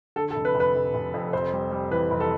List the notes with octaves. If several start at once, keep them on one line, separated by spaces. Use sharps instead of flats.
D3 A4
A4
F1
B4
F1
B4
F1
F1
F2
F1 C5
G3
G3
E3 B4
F1
A4